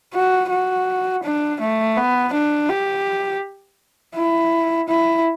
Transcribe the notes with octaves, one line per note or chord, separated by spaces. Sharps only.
F#4
F#4
D4
A3
B3
D4
G4
E4
E4